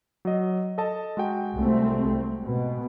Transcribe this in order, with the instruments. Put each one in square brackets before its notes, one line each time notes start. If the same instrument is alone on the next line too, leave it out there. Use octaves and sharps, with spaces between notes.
[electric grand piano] F#3 D#5
A4 D#5 A5
G#3 F#4 G5
[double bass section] C2 A3 C4
B2